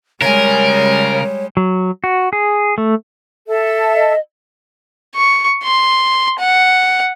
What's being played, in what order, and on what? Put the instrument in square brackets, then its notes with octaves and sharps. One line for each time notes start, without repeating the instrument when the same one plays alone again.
[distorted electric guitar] C#3 G#5 [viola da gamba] G3 G#3 [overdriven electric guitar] A#4 [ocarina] C#5
[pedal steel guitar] F#3
F#4
G#4
A3
[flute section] A4 E5
[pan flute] D#5
[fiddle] C#6
C6
F#5